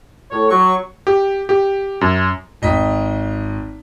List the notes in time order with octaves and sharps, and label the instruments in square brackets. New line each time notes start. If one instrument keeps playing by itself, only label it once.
[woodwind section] A2 C#5
[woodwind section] F#3 [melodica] C#6
[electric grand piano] G4
G4
F#2
[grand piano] G#1 D#5 G5 B6